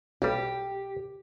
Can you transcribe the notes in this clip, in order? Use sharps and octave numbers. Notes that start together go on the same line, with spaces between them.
B1 G3 G4